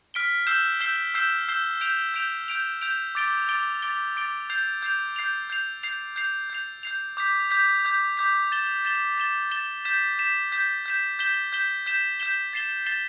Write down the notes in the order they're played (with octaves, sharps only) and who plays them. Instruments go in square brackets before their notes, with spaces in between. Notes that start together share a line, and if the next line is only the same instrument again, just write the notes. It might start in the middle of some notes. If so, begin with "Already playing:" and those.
[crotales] F6 B6 D7 G7
E6 G6 C7 E7 G7
E6 G6 C7 E7 G7
E6 G6 C7 E7 G7
E6 G6 C7 E7 G7
G6 D7 F7
G6 D7 F7
G6 D7 F7
G6 D7 F7
D6 A6 D7 G7
D6 A6 D7 G7
D6 A6 D7 G7
D6 A6 D7 G7
G6 C7 F7
G6 C7 F7
G6 C7 F7
G6 C7 F7
G6 C7 F7
G6 C7 F7
G6 C7 F7
G6 C7 F7
D6 G6 B6
D6 G6 B6
D6 G6 B6
D6 G6 B6
A6 E7 G7
A6 E7 G7
A6 E7 G7
A6 E7 G7
G6 B6 E7
G6 B6 E7
G6 B6 E7
G6 B6 E7
G6 B6 E7 G7
G6 B6 E7 G7
G6 B6 E7 G7
G6 B6 E7 G7
A6 C7 E7 G7
A6 C7 E7 G7